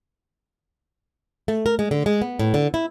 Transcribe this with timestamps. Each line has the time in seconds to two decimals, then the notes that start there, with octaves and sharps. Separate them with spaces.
1.48 A3
1.66 A#4
1.79 G#3
1.91 D3
2.06 G#3
2.22 B3
2.39 A2
2.54 D3
2.74 E4